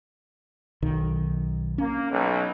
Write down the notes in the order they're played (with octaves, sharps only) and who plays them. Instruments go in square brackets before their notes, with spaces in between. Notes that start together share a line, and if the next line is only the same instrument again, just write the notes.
[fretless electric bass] B1 D#3
[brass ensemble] A#3 [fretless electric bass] C#4
[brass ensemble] B1